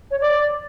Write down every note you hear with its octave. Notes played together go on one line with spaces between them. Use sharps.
C#5
D5